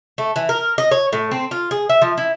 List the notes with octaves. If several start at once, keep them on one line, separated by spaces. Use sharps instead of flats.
A3
E3
A#4
D#5
C#5
A2
C4
F4
G#4
E5
F3
E4